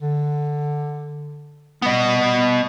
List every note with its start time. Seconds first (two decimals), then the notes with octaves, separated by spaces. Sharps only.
0.02 D3
1.82 G3 B3 D#5